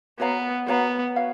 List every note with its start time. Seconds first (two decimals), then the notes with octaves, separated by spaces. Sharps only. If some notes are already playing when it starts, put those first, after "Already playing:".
0.20 B3 F#4 C#5 F5 A#5
0.68 B3 F#4 C#5 F5 A#5
1.16 F#4 C#5 F5